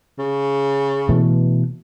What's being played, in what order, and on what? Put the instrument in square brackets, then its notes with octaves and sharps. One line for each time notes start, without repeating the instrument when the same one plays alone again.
[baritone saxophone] C#3
[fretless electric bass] B2 E3 A3